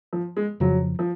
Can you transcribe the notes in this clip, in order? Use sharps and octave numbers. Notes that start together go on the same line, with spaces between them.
F3
G#3
F2 C#3 F3 F#3
F3